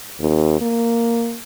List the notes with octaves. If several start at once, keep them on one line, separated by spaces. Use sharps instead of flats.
D#2
A#3